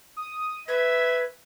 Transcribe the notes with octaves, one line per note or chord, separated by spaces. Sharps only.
D#6
B4 E5 G#6